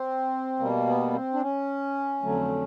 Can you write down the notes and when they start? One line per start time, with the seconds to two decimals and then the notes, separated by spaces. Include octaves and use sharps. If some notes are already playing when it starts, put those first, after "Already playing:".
Already playing: C4
0.59 B2 G3 A#3
0.86 B3
1.14 C4
1.34 D4
1.41 C#4
2.23 F2 D3 F#3 A3